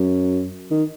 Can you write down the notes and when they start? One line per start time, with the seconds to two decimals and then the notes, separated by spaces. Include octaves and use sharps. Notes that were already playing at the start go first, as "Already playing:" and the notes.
Already playing: F#2
0.71 D#3